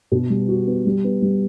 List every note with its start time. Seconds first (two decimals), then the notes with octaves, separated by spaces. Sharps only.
0.12 B2
0.30 G3
0.48 F#4
0.67 B3
0.86 G3
1.04 B3
1.22 G3